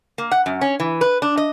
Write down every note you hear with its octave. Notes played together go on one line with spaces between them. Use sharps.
A#3
F#5
F#2
C#4
E3
B4
D4
D#5